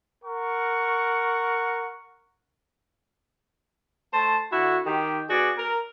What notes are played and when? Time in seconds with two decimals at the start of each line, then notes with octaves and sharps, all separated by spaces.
0.25 A#4 F#5 C#6
4.12 A3 C5 A5
4.51 D3 E4 F#4
4.85 D#3 G4
5.29 B3 F#4 G#4 D5
5.58 A#4